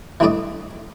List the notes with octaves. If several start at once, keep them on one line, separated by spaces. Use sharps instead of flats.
E3 G3 A3 D4 D5 D#5